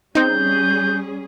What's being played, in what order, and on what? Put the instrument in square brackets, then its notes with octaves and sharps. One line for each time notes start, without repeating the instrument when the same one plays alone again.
[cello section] G3 C#4 G#4 [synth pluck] C4 D#4 [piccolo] G6